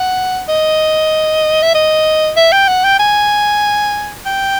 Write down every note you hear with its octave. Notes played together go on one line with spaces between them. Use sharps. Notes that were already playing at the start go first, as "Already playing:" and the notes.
Already playing: F#5
D#5
E5
D#5
E5
G5
F#5
G5
G#5
G5